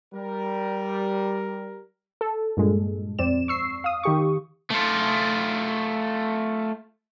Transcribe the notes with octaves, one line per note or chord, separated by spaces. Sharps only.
G3 A#4
A4
G2 A#2 G#3
F2 C4 D5 E7
C#6 E6 C7
F5 D#6
D#3 G4 C#6
A3 F4